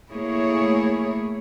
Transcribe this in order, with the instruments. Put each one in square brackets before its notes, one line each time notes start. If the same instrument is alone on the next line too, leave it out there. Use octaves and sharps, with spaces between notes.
[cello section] A3 A#3 E4 G#4 C#5